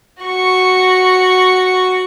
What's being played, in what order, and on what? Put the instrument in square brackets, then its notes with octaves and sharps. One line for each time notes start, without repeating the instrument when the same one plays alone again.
[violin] F#4 C#6